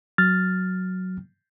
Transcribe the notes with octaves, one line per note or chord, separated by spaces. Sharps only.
F#3 F6 A6